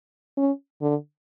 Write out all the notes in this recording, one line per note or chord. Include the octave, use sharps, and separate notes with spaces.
C#4
D3